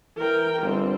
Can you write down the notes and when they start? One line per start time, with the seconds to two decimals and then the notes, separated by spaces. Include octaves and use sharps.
0.17 E3 A#4 G5
0.62 G1 G3 C4